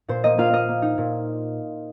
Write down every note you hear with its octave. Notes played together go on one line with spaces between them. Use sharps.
A#2 C5
A#3 D#5
A#3 F4 F5
A#3 D#5
A#3
D#4
A#2